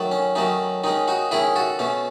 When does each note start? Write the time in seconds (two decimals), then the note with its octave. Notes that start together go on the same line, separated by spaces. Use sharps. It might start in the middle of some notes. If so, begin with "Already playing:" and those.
Already playing: D#3 F#3 A3
0.11 C#4
0.35 D#3 F#3 A3 C#4 D#4
0.84 D#3 G#3 C#4 D#4
1.08 D#4 F#4
1.31 D#3 G#3 C#4 E4 G#4
1.56 F#4 A4
1.79 B2 A3 C#4